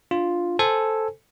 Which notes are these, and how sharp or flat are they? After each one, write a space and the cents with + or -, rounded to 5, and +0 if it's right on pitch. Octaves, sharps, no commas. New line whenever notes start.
D4 +5 F4 +0
A4 +0 C5 +5 G#5 +0